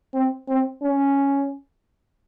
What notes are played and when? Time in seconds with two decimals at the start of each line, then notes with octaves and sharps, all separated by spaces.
0.14 C4
0.48 C4
0.82 C#4